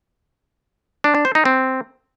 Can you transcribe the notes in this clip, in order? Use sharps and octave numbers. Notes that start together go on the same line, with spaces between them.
D4
D4
C5
D#4
C4